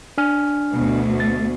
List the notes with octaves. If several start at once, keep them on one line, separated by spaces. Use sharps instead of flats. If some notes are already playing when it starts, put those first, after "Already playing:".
D4 G#5 F6
D2 B2
A6